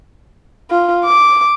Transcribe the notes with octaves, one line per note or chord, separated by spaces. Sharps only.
F4
D6